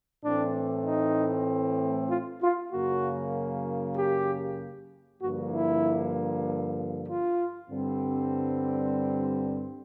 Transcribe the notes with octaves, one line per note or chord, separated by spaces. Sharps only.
A2 E3 A3 C4 D4
D#4
F4
F4
F#2 C#3 F#3 A#3 F#4
G4
G2 D3 F3 A#3 F#4
E4
F4
G2 D3 G3 C4